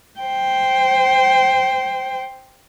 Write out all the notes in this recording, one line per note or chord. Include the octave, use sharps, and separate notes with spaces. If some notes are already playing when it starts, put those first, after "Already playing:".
C5 G5